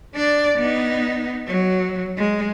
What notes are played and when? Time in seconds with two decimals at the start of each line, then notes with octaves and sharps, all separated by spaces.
0.15 D4 D5
0.58 B3 D#4
1.47 F#3
2.18 G#3